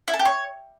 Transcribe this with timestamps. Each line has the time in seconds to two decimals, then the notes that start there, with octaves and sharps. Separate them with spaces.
0.08 E4
0.14 A4
0.19 G4
0.25 C#5